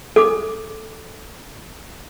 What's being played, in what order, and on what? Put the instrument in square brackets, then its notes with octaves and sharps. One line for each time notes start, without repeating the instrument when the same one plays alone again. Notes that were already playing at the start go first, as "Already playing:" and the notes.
[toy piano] A4 D6